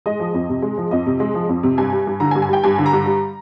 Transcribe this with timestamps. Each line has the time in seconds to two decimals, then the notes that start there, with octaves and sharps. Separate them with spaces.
0.06 G#3 D#5
0.20 F3
0.34 F2
0.49 C3
0.62 G#3
0.78 F3
0.91 F2 D#5
1.06 C3
1.20 G#3
1.35 F3
1.49 F2
1.63 C3
1.78 G2 G#5
1.92 G3
2.07 G2
2.20 D3 A#5
2.31 G#5
2.35 G2
2.42 G#5
2.49 G3 G5
2.63 G2 G#5
2.78 D3
2.86 A#5
2.93 G2
3.06 G3